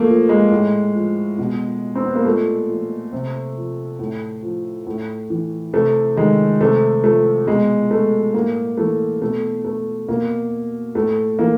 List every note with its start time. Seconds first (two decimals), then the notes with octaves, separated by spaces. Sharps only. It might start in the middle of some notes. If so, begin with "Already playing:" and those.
Already playing: A#2 A3 A#3
0.08 F3
0.29 G#3
0.52 A2
0.95 F3
1.38 B2
1.95 C4
2.06 B3
2.15 A#3
2.25 A#2 A3
2.69 F3
3.12 C3
3.56 F3
3.99 A2
4.43 F3
4.87 A2
5.30 E3
5.73 C3 A3
6.16 D#3 G#3
6.61 C3 A3
7.04 F3 A3
7.47 B2 G#3
7.91 A3
8.34 A2 A#3
8.78 E3 A3
9.21 B2 A3
9.65 A3
10.08 B2 A#3
10.95 A2 A3
11.39 E3 A#3